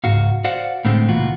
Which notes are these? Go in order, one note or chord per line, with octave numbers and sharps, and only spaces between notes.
C#2 G#2 F#4 F5
F#4 C5 D5 F5 F#5
A2 D3 G#3 A3 C4
C#2 A#2 E3 F4 F#4